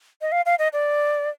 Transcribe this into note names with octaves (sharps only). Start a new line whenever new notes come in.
D#5
F5
F5
D#5
D5